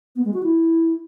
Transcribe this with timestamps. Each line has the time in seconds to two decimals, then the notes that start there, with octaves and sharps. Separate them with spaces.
0.16 B3
0.25 G#3
0.34 F#4
0.43 E4